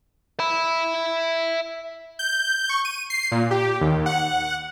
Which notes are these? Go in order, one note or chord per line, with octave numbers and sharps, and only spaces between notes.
E5 B5
G6
C#6
D#7
C7
A#2
G4
D#2
F#5